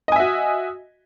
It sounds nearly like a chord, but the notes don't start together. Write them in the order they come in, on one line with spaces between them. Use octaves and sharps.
D#5 G#5 E5 F#4